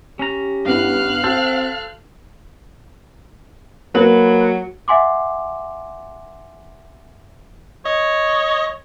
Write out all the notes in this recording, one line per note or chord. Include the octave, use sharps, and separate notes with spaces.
C#4 G4 A#5
G2 B3 E4 F5 F6 F#6
C4 F#4 A4 C5
F#3 A#3 B4
E5 F#5 G#5 C6 D6
C#5 D#5